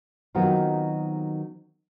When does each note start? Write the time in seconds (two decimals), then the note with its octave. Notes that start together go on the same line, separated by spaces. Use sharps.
0.35 D#3 F#3 B3 C4 D#4 F4